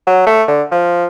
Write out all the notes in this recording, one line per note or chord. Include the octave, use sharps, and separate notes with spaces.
F#3
A3
D3
F3